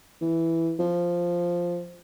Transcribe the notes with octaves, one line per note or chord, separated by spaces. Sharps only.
E3
F3